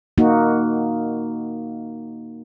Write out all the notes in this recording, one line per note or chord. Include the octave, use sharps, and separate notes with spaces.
A#3 D#4 F#4